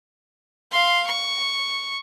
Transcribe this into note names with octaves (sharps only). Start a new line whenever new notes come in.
F5 C6
C#6